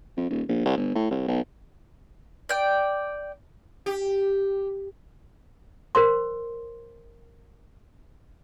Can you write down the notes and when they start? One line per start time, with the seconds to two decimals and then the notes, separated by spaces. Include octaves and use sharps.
0.17 F2
0.30 D#1
0.48 A#1
0.65 C2
0.77 G1
0.95 A2
1.11 C2
1.28 B1
2.49 D5 G5
3.86 G4
5.95 A#4 C5 C6